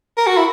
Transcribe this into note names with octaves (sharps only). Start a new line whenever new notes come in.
A#4
F#4
E4